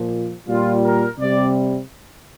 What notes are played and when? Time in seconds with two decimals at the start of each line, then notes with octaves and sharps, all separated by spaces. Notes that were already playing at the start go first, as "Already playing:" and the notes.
Already playing: A#2 F3
0.47 A#2 G3 F4
0.84 A#4
1.19 C3 G3 D5